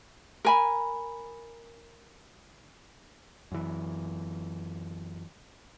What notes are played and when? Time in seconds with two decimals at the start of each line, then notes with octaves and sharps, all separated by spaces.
0.45 A#4 G#5 B5
3.52 F#2 E3